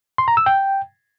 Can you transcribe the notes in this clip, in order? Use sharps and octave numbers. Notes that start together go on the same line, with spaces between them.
C6
A#5
E6
G5